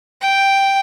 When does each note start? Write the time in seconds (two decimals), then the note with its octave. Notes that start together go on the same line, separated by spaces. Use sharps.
0.22 G5